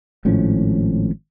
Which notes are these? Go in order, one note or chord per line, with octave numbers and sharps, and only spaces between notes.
G#1 A2 F3 C#4